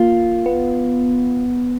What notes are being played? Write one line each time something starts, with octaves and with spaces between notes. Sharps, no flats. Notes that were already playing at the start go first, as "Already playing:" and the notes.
Already playing: A#3 F4
B3